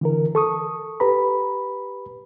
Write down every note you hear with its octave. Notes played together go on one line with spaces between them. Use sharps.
D3 E3 A#4
A4 C#6 D#6
G4 B4 A#5 B5